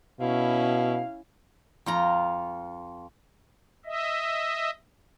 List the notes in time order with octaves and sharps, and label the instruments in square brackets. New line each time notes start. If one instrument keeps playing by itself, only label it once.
[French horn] B2 [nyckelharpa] C#4 E4 [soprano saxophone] F5
[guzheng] F2 F4 A#5
[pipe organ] D#5 E5